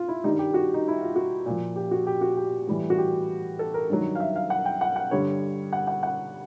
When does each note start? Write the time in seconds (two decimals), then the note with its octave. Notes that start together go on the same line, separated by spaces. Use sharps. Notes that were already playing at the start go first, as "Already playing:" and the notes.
Already playing: F4
0.08 E4
0.24 G2 D#3 G3 D#4
0.39 G4
0.54 F#4
0.74 D#4
0.88 E4
1.01 F4
1.16 F#4
1.46 A#2 F3
1.76 G4
1.91 F#4
2.07 G4
2.21 F#4
2.37 G4
2.68 A2 E3 G3
2.90 F#4
2.98 G4
3.59 A4
3.74 A#4
3.90 G2 D#3 F#3
4.15 F5
4.20 E5
4.36 F5
4.50 F#5
4.65 G5
4.81 F#5
4.96 F#5
5.11 G2 D3 G3 C#5
5.73 F#5
5.87 F#5
6.03 F#5